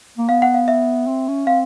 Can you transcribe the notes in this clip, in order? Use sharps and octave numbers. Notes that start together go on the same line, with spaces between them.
A#3
B3 F5
F#5
F5
E5
C4
C#4
C4 F5